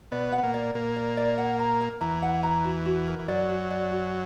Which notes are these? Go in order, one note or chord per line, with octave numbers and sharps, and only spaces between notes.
B2 B3 D5
F#5
B3
A#2 A#3
D5
A#2 A#3 A#4
D5
D5
F#5
A#5
A#4
E2 E3 A#5
F#5
A#5
F#4
F#4
A#4
E3
F#2 F#3 D5
F#4
D5
F#4